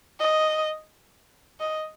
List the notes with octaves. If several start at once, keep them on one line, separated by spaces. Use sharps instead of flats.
D#5
D#5